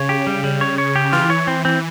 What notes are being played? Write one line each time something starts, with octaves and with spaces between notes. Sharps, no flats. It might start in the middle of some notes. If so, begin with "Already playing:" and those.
Already playing: C#3 C#5
G4
G3
G3
C#5
C#5
G4
E3 F4
C#5
C4
C4